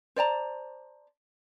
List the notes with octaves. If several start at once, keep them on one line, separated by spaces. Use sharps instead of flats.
C5 D5 A5 A#5